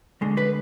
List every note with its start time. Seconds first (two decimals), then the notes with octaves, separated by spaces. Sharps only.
0.21 D2 D3 G#3
0.37 B4